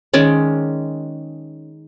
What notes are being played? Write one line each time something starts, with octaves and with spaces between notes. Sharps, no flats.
D#3 G#3 C#4 D5